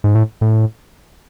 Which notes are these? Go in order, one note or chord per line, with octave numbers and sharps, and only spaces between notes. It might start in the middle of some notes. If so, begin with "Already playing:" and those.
G#2
A2
A2